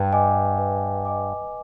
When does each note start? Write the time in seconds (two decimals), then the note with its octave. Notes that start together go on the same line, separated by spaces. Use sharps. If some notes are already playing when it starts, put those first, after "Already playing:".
Already playing: G2 B4
0.13 D#5 G#5 D6
0.58 B4
1.05 D#5 G#5 D6